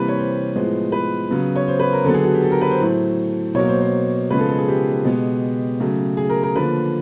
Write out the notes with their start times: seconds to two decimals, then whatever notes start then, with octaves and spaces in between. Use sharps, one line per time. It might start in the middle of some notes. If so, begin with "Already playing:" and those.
Already playing: C3 E3 G3 A#3 B4
0.08 C#5
0.18 C5
0.55 A2 F3 G#3 B3
0.92 B4
1.31 C#3 F#3 B3
1.56 C#5
1.67 C5
1.80 B4
1.93 A#4
2.05 D3 F#3 B3 A4
2.14 G#4
2.24 F#4
2.34 G4
2.42 A4
2.52 A#4
2.61 B4
2.70 C5
2.80 A2 F#3 A3
3.55 B2 F#3 A#3 C#5
3.68 C5
3.81 C5
4.30 C#3 F3 G#3 B3 B4
4.39 A4
4.49 A4
4.58 G#4
4.68 G4
5.04 B2 G#3 B3
5.80 C#3 F#3 A3
6.17 G#4
6.29 A#4
6.43 A#4
6.55 D3 F3 A#3 B4